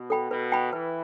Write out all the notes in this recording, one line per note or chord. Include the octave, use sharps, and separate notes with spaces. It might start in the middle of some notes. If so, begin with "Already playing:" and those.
Already playing: B2
A4 G5 B5
B2 B4
G5 B5
E3 B4